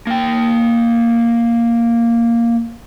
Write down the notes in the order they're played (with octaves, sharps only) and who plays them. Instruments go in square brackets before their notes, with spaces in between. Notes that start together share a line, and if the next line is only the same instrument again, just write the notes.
[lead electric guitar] A#3 G5